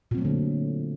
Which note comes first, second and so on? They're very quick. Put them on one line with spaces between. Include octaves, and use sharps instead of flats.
A#2 C4 F#3 A3 D3